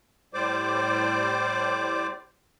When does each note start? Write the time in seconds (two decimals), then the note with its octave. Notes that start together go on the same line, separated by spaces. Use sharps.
0.34 A2 G3 C5 D5 D6